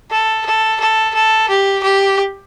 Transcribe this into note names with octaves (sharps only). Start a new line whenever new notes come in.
A4
A4
A4
A4
G4
G4